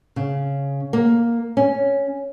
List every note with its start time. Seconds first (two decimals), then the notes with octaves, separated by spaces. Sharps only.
0.16 C#3
0.93 A#3
1.57 C#4